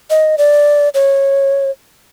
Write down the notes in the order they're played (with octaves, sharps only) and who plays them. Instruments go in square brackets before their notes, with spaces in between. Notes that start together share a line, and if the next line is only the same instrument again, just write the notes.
[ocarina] D#5
D5
C#5